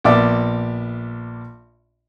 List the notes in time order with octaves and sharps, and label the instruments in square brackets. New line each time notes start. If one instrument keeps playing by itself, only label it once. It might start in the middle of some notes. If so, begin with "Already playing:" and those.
[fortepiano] A#1 A#3 B3 D5 E5 D6